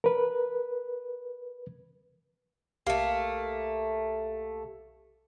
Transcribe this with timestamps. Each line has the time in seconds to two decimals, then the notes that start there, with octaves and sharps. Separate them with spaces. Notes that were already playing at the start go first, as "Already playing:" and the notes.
0.04 A#4 B4
2.87 B1 A3 A#3 G4